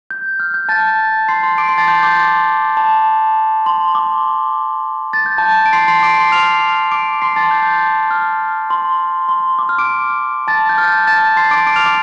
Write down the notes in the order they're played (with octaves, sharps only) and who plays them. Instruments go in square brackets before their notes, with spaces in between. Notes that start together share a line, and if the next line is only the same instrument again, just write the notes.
[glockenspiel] G6
F6
G6
A5 A6
C6 C7
C6 C7
D6 D7
C6 C7
A5 A6
G6
D6
C6
A5
C6
D6
A6
G6
A5 A6
D7
C6 C7
C6 C7
D6 D7
C6 C7
F6 F7
D6 D7
C6 C7
A5 A6
G6
F6
C6
C6
D6
F6
D6 D7
A5 A6
G6
F6
A5 A6
C6 C7
D6 D7
D6 D7
F6 F7
D6 D7